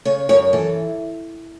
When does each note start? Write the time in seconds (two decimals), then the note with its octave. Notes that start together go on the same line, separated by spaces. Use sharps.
0.05 C#3 C#5
0.29 F#2 C#5
0.53 E3 A4